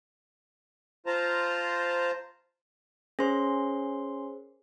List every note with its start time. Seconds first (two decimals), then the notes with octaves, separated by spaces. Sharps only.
1.06 F4 C5 A5 A#5
3.19 C#4 G#4 A#4 C5 C6